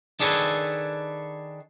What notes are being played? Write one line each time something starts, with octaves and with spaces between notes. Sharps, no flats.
D#3 D4 G#4 A4 B4 C#5